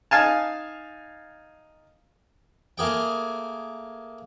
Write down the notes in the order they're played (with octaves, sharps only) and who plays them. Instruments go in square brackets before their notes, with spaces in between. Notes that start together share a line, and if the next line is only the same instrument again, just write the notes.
[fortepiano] D#4 F5 G#5 A5
[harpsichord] A3 A#3 G#4 G5